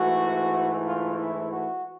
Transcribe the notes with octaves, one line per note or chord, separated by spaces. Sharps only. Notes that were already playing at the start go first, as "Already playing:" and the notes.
Already playing: G#2 E3 A3 F#4
F4
E4
F#4